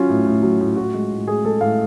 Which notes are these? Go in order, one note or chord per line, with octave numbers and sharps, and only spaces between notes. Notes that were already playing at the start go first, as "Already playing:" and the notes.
Already playing: F#3 C#4 F4
A2
A2
F#3
A2
A2 F#4
G#3
A2
A2 G#4
G#3 A4
A2 F5